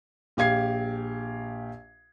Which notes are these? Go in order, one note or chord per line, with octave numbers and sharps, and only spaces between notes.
A#1 G4 F5 G#6 C7